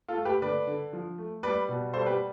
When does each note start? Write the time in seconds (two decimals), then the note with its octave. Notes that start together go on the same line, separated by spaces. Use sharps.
0.08 F4 A4
0.17 A3
0.25 G4 B4
0.42 D3 B4 D5
0.67 D3
0.93 F3
1.18 A3
1.43 G3 B4 D5
1.69 B2
1.93 G3 A4 C5
2.06 G4 B4